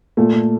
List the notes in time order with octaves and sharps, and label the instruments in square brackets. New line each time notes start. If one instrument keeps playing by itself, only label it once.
[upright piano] A#2 A3